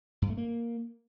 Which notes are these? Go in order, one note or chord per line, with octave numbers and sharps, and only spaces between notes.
G2
A3
A#3